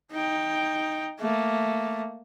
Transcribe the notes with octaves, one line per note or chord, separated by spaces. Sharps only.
D#4 G5
A3 A#3